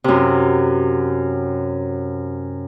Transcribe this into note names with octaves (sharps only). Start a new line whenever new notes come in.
F#2 C3